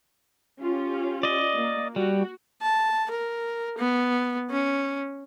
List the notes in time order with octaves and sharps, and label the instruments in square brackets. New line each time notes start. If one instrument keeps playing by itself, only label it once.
[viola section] C#4 F4 G4
[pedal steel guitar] D5 D#5
[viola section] A#3
[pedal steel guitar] G3 [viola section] F#4
[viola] A5
A#4
B3
C#4